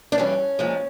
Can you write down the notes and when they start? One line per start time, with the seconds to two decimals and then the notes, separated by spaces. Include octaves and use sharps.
0.12 D4
0.18 G2 E3 G3 C#4
0.59 A#2 F3 G#3